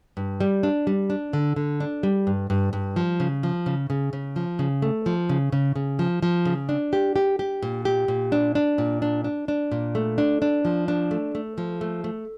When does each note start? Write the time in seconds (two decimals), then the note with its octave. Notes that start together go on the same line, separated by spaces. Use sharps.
0.17 G2
0.41 G3
0.63 D4
0.87 G3
1.10 D4
1.33 D3
1.56 D3
1.80 D4
2.03 G3
2.27 G2
2.50 G2
2.73 G2
2.96 F3
3.20 C#3
3.43 F3
3.66 C#3
3.90 C#3
4.13 C#3
4.36 F3
4.59 C#3
4.82 A3
5.06 F3
5.29 C#3
5.52 C#3
5.76 C#3
5.99 F3
6.22 F3
6.45 C#3
6.69 D4
6.93 G4
7.16 G4
7.39 G4
7.63 A#2
7.85 G4
8.08 A#2
8.32 D4
8.55 D4
8.78 A#2
9.02 D4
9.24 D4
9.48 D4
9.72 A#2
9.95 A3
10.18 D4
10.42 D4
10.65 F3
10.88 D4
11.11 A3
11.35 A3
11.58 F3
11.81 A3
12.04 A3